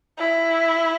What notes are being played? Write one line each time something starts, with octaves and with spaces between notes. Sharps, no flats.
E4